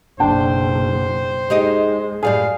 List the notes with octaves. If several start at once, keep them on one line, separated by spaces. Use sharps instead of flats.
F#1 B1 D4 C5 G5 A5
G#3 D#4 G4 D#5
F#2 A2 G3 G#4 D5 F5